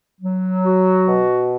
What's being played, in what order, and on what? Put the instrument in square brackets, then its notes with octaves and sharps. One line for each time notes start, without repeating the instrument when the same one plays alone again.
[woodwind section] F#3
F#4
B2